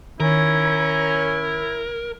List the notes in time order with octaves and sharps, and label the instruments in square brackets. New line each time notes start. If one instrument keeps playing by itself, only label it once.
[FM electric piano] D#3 [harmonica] C#4 [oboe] E4 [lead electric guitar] A#4